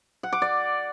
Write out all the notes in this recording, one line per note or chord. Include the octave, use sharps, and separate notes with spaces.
F#5
D6
D5